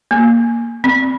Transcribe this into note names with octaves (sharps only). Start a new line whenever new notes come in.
A#3
C4